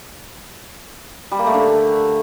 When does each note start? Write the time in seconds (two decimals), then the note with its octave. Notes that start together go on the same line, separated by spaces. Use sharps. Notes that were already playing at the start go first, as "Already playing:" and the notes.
1.32 G3
1.39 A#3
1.47 A3
1.54 D3